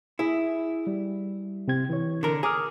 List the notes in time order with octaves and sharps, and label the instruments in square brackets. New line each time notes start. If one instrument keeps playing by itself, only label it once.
[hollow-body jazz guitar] E4 [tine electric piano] G#4 E5
[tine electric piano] G3
C3 C4 G#6
E3 C#5
[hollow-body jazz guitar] D3 A#4
[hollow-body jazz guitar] G#4 [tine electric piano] A#5 D6 F6